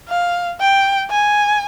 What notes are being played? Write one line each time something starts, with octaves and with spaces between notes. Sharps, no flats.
F5
G5
G#5